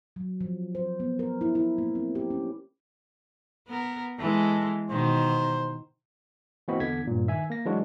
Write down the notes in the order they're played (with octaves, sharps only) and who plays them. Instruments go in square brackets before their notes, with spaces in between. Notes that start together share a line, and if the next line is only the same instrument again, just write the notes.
[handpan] F#3
F3
C5
B3
A#4
E4
E4
A#3
C4
G4
C#4
[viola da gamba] B3 A#4
[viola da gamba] E3 G#3 [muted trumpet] A4
[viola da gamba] B2 D#3 [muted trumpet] C5
[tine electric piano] E3 A#3 C4 F#4 D#5 B5
E2 D3 G#6 B6
G2 A#2
D#3 E5 G#5
A#3 A#6
E3 F#3 G#3 D4 F#4